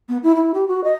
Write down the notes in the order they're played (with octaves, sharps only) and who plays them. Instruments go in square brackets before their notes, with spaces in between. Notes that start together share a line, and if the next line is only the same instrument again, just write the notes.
[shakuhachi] B3
E4
E4
G4
F#4
D#5